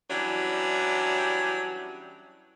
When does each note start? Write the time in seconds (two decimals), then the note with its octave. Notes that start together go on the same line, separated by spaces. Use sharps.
0.09 E3 F#3 G3 C#4 D4 E4